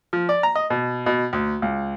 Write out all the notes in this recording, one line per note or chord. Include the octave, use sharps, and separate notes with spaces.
F3
D5
A#5
D#5
B2
B2
D2
C#2